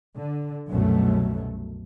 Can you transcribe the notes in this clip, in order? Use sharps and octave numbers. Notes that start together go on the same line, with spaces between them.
D3
C2 F#2 B2 F#3 A3